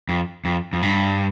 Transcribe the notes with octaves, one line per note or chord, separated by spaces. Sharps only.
F2
F2
F2
G2